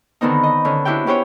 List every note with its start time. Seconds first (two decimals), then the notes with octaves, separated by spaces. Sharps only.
0.21 D3 D#3 B3 C4 D#4
0.43 D#5
0.65 D3 C#4
0.85 D4 E4 F#4 G4 G5
1.06 B3 C#4 G4 C5 C#5